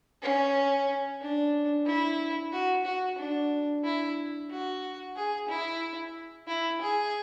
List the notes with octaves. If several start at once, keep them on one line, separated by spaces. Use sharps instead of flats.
C#4
D4
E4
F#4
F#4
D4
E4
F#4
G#4
E4
E4
G#4